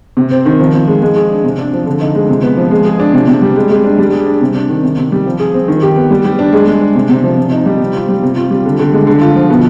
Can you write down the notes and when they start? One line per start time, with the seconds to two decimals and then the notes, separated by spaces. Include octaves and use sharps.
0.17 C3
0.31 C4
0.46 D#3
0.60 F3
0.73 F3
0.88 G#3
1.02 G#3
1.16 G#4
1.30 D4
1.44 C3
1.58 D4
1.73 F3
1.87 D3
2.01 D#4
2.15 G#3
2.29 C3
2.43 B3
2.57 F3
2.71 G#3
2.85 G#4
3.00 D4
3.14 C3
3.28 C3
3.42 G3
3.56 G#3
3.71 G#3
3.84 D4
3.99 G3
4.13 G#4
4.26 D4
4.41 C3
4.55 D4
4.69 D#3
4.83 C3
4.98 C3
5.12 G3
5.26 F3
5.40 G#4
5.54 C4
5.68 D#3
5.82 G4
5.97 B3
6.11 G3
6.25 G3
6.39 D4
6.53 G#3
6.67 G#3
6.81 D4
6.95 C3
7.09 C3
7.24 F3
7.37 C3
7.52 D#4
7.66 G3
7.80 C3
7.94 F4
8.09 G3
8.23 C3
8.37 F4
8.51 G3
8.65 D3
8.79 D3
8.93 G#3
9.07 D3
9.21 F4
9.35 F3
9.50 B2